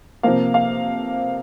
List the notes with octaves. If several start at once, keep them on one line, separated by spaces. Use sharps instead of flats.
C3 F3 A#3 F5
F5